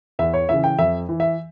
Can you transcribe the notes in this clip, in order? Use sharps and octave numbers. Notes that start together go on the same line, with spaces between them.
E2 E5
C#5
C#3 E3 E5
G5
F2 E5
E3
E5